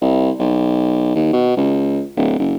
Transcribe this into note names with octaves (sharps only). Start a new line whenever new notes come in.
C2
B1
D#2
B2
C#2
D1
F#1